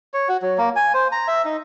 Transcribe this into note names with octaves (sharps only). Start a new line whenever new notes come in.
C#5
F#4
F#3
A#3
G#5
C5
A#5
E5
D#4